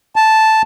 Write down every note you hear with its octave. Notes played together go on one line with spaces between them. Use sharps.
A5